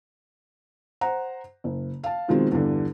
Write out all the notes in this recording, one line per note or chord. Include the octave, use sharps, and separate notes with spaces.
C5 F#5 A#5
F#1
F5 A5
B2 D#3 F3 G#3 C4
E2 G2 D3